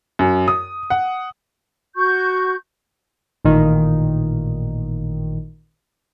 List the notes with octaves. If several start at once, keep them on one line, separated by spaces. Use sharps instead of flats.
F#2
D#6
F#5
F#4 C#6 G6
A1 A#2 D#3